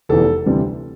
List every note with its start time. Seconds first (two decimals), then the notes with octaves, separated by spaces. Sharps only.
0.09 F1 E2 E3 A4
0.46 D2 C3 E3 G3